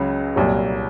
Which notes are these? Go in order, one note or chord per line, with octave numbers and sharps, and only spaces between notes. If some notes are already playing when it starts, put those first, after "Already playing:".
Already playing: C#2 C#3 F#3
C2 A#2 F#3